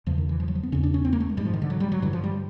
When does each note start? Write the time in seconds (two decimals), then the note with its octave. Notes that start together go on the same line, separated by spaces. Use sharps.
0.06 E2 C#3 F3
0.18 D#3
0.29 E3
0.40 F3
0.48 F#3
0.55 F3
0.63 B3
0.72 E2 C#3 C#4
0.83 D4
0.94 C#4
1.05 C4
1.13 A#3
1.20 A3
1.30 G#3
1.37 G#2 G3
1.45 F3
1.53 D#3
1.62 D3
1.70 F#3
1.80 G3
1.92 F#3
2.02 G2 D3 E3
2.13 F3
2.24 G3